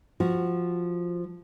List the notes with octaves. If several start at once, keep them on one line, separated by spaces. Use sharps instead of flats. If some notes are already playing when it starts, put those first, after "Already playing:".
F3 F#4